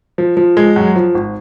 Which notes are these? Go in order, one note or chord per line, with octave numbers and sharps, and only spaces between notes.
F3
F3
G#3
F#2
F3
G#1